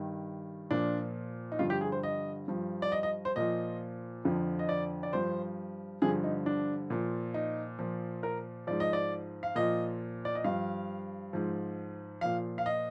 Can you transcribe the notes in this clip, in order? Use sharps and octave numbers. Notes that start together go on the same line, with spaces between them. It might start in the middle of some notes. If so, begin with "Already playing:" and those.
Already playing: G2 D#3
A#2 F3 D4
D#4
G2 D3 F3 F4
G4
G#4
C5
D#5
G2 F3
D5
D#5
D#5
C5
A#2 F3 D#5
F2 D3 F3
D#5
D5
D5
G2 F3 C5
G2 D3 F3 G#4
D#4
D4
A#2 F3
D#4
A#2 F3
A#4
G#2 F3 D5
D#5
D5
F5
A#2 F3 D#5
D5
D#5
G2 F3 F5
G#2 F3
A#2 F3 F5
F5
D#5